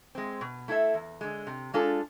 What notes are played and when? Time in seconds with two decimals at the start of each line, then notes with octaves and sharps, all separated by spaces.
0.15 G#3 C4
0.41 B2
0.68 A3 E4 A4 E5
0.94 E2
1.21 D3 G#3
1.47 C3
1.74 G#3 D4 F4 A4